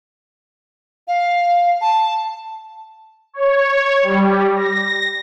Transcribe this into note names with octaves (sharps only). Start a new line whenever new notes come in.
F5
A5
C#5
G3
A#6